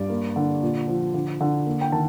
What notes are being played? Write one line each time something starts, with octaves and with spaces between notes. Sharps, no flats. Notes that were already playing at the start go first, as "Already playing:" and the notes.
Already playing: G2 D5
A#3
D3
A#2
F3
D3
D3
A#3
G5
D#3 A5